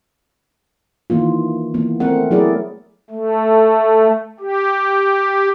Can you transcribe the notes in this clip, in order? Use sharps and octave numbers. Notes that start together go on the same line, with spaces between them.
D#3 E3 A#3 F4
E3 A#3 B3
A3 C4 A#4 F#5
F#3 A3 E4 G#4 A#4 D5
A3
G4